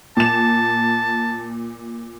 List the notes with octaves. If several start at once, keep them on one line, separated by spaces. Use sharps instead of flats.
A#2 A5 E7